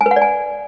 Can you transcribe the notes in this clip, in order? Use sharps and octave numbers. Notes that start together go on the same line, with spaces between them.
G#5
B4
F#5
D5
G#5